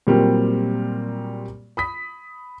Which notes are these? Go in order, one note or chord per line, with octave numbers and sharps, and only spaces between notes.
A#2 F#3 G3 A#3 C4 G4
B5 D#6 B6